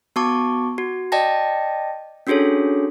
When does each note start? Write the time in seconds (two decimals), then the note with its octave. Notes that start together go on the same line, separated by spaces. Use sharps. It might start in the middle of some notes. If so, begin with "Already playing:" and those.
0.16 B3 F#4 A5 C#6 D6
0.78 F#4
1.12 D5 D#5 G5 A5 A#6
2.27 C#4 D4 F#4 G#4 A4 C#5